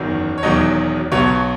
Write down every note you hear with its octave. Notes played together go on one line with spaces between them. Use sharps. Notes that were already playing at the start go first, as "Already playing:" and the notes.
Already playing: F#1 E2 D#3 F#3
C#5
E1 E2 D#3 F#3 D#5
B1 B2 F#3 C#5